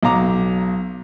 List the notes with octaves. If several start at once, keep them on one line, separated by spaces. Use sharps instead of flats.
B1 F#3 F5 A#5 D6